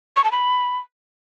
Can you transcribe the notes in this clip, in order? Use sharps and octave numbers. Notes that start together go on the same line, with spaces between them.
C#6
A5
B5